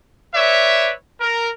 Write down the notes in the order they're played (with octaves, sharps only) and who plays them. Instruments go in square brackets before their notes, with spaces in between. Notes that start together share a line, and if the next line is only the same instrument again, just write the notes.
[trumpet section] B4 C#5 D5 E5
A#4